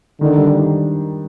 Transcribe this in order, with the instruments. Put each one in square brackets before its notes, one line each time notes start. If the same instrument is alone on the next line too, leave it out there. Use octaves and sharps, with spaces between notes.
[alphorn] D3 [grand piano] D#3
[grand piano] G3 D4
D#3